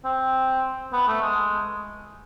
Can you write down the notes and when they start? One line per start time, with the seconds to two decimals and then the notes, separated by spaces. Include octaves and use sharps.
0.05 C4
0.93 B3
1.07 A3
1.22 G#3